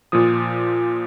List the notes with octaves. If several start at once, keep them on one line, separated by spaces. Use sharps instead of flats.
A#2 F3 D#6